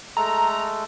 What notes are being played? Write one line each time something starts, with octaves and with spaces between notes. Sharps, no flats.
G#3 A3 A4 A#5